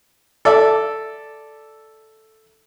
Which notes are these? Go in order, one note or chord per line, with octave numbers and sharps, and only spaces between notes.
A4 D5 E5